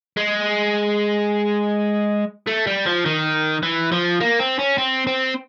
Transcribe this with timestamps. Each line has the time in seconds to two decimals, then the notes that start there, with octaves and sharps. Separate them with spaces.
0.17 G#3
2.47 A3
2.67 G3
2.86 F3
3.05 D#3
3.63 E3
3.92 F3
4.20 A#3
4.40 C4
4.59 C#4
4.78 C4
5.07 C4